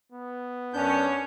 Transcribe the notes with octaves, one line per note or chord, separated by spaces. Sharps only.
B3
F#2 C#4 D4 G6